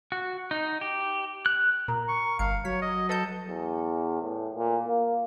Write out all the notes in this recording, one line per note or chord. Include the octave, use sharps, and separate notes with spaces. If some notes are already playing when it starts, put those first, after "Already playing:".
F#4
D#4
G4
F#6
A#2 A#4
C#6
G1 F5 C#7
F#3 C#5 B6
D#5
A4 B4 D#5 G6
E2
A2
A#2
A#3